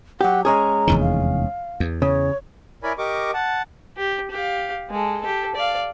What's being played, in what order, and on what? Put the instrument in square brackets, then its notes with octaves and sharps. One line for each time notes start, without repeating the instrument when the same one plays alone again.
[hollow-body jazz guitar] F#3 G4 [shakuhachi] F#5
[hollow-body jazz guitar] G#3 C#4 G#4 [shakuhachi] A#5
[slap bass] F1 E2 D#3
[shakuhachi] F5
[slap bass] E2
[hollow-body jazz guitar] C#3 [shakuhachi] C#5
[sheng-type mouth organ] E4 A#4 C#5 D5 G#5 B5
G4 A#4 D#5 C#6 D6
F#5 A5
[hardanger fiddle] G4
G4 F5
G#3 A4
G4 A4
D5 F5